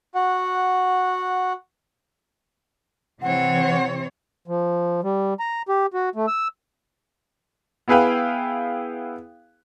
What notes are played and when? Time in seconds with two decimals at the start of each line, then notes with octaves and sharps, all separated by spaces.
0.15 F#4 F#5
3.22 C3 E3 C4 C#5 F#5
4.48 F3
5.04 G3
5.40 A#5
5.69 G4
5.94 F#4
6.15 A3
6.27 E6
7.88 B3 E4 G#4 B4 F5 G5